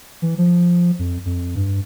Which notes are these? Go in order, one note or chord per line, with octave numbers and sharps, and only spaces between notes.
E3
F3
F2
F2
G2